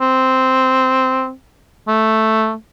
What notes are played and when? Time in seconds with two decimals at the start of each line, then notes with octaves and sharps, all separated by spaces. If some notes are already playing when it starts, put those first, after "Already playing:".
0.01 C4
1.88 A3